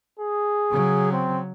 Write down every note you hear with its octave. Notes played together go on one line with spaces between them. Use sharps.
G#4
C#3 F#3
C4